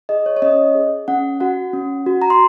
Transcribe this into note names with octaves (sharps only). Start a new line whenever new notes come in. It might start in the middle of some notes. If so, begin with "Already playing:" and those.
G#4 D#5
C#5
C#5
C#4 D#5
G#4
C#4 F#5
F#4 F#5
C#4
F#4
A#5
C6